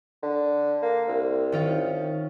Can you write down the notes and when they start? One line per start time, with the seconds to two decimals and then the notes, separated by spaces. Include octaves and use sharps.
0.23 D3
0.82 A#3
1.08 C2
1.52 D#3 C#4 F4